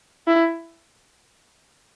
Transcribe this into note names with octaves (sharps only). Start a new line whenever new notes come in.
E4